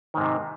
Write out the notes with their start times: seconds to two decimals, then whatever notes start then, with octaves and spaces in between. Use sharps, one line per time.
0.14 D#3
0.17 G#2
0.21 C3